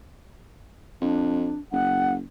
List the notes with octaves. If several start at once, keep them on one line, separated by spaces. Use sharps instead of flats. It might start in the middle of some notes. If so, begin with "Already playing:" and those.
F2 D4
F#1 F#5